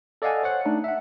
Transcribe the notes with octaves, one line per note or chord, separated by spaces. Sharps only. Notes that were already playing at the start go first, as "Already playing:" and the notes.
A4 D5 D#5 F5 F#5 G#5
C5 C#5 F#5
A3 D4 D#4
E5 F#5